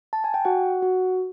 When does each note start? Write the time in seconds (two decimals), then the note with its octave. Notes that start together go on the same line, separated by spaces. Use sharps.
0.13 A5
0.24 G#5
0.34 G5
0.45 F#4 F#5
0.82 F#4